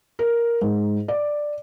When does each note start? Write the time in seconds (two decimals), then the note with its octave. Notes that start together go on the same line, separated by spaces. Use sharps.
0.19 A#4
0.62 G#2
1.08 D5